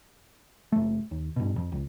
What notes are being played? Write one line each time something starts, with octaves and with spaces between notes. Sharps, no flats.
F#1 A3
D#2
G2 B2
F2
C#2